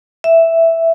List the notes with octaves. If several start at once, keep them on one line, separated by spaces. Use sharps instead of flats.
E5